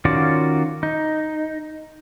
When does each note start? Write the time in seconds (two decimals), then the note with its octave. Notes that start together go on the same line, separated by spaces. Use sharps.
0.05 D#3 C#4 F4 F#4 D5
0.83 D#4